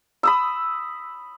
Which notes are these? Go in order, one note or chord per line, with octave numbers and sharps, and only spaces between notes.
B5 D#6 E6